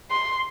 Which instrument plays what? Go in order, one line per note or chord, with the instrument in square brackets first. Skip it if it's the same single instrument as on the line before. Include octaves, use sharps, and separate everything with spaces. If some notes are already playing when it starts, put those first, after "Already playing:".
[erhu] C6